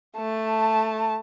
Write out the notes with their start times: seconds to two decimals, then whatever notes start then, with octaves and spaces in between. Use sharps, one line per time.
0.17 A3 A5